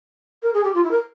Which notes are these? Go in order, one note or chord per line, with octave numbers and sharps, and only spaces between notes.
A#4
G#4
G4
F4
E4
A#4